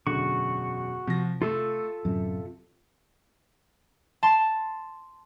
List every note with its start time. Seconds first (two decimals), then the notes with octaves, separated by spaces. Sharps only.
0.07 E1 F#2 D3 F#4 C#6
1.07 C3 F3 A#6
1.42 A3 F4 A4 E6
2.05 D1 F#2 C3
4.23 A5 C6